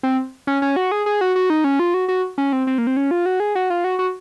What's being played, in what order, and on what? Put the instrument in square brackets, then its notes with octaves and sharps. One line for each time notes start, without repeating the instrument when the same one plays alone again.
[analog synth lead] C4
C#4
C#4
F#4
G#4
G#4
F#4
F#4
D#4
C#4
F4
F#4
F#4
C#4
C4
C4
A#3
C4
C#4
F4
F#4
G#4
F#4
F4
F#4
F#4